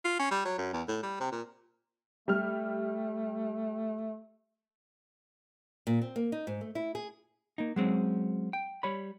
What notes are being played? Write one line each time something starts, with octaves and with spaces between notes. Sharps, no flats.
F4
C#4
G3
F#3
F#2
E2
A2
G3
C3
A#2
G3 A3 F6
A#2
C4
A#3
D#4
G#2
A3
E4
G#4
A#3 D#4
F#3 G#3 C4 C#4
G5
G3 C#5 B5